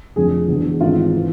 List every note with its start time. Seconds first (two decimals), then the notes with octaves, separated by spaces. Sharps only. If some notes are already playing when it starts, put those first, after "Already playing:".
0.16 F1 F2 D3 G#4
0.48 E1 E2 D3
0.81 G#1 G#2 E3 F4
1.17 E3